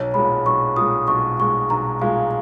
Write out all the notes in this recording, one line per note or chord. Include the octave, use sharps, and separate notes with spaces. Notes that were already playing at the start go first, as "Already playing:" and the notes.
Already playing: B1 C#5
A#2 G#3 B5
B1 C#6
A#2 G#3 D#6
B1 C#6
A#2 G#3 C#6
B1 A#5
A#2 G#3 F5